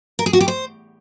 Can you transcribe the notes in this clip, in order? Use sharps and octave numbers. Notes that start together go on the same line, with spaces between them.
A#4
G#4
F#4
G4
C5